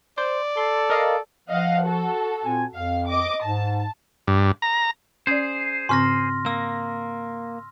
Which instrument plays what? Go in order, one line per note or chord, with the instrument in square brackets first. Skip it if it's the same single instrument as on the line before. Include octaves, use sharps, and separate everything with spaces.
[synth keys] C5 [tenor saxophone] D5
[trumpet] A4 [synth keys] C6
[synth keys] A#4 D#5 F5
[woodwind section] F3 [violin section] D#5 F5 F#5
[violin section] F#4 A4
[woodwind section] A#2 C4 G#5
[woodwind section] F2 [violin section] F5
[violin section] D#5 D6
[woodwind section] G#2 [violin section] A5
[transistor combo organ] G2
A#5
[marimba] C#4 D5 [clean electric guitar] G#4 C5
[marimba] G#2 C#3 C4 [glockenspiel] C6 F6 A#6
[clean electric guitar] A#3 [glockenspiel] E6